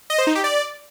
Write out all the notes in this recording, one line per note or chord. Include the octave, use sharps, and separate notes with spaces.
D#5
C5
D#4
G4
D5